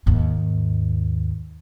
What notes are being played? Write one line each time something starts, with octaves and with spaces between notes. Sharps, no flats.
D#2 G#2